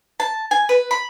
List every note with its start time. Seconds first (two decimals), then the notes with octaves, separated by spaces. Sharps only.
0.20 A5
0.51 G#5
0.69 B4
0.91 B5